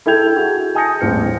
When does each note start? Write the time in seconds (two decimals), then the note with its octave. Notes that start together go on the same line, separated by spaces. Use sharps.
0.06 E4 A4 G5 G6 G#6 F7
0.36 F#4 G#4
0.75 G#5 A5 D#6 G6 A#6 C#7
1.01 D#1 A1 G#3 C4 F6 C#7